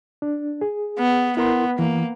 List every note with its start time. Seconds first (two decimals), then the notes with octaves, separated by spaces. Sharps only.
0.22 D4
0.61 G#4
0.99 B3
1.37 B3 E4 A#4 C6
1.79 E3 A#3